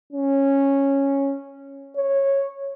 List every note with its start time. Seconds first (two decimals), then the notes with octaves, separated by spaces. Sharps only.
0.13 C#4
1.96 C#5